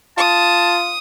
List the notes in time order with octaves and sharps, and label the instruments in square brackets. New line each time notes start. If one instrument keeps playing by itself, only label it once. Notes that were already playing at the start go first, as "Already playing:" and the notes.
[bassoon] F4 [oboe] A5 [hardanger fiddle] D#6